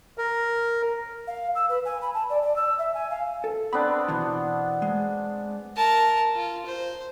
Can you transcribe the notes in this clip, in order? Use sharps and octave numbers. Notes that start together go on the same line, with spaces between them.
A#4
F5
E6
B4
G#5
B5
A5
D5
D5
E6
E5
G#5
F5
A4
B3 C4 D4 B5
B2 E3
G#3
A#4 A5
F4
C5